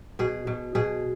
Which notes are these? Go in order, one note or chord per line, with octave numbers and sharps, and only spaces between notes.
B2 G#4
B2
B2 G#4